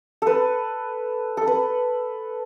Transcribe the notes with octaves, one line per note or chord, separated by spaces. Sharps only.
A4 B4
A4
B4